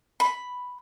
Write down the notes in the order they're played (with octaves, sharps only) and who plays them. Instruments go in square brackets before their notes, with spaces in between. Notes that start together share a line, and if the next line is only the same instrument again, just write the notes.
[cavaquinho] B5